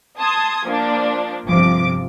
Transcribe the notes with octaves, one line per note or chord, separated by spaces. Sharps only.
A5 C6 D#6 G#6
F3 A#3 D4
G1 C3 F3 D6